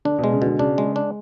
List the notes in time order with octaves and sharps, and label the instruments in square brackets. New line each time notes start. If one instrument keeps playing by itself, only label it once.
[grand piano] D3 [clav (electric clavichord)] D4
[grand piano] B2
[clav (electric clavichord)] G#3
[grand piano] C#3
[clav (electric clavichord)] B2 [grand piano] D3
[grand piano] C#3 [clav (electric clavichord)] D4
[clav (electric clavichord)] G#3
D4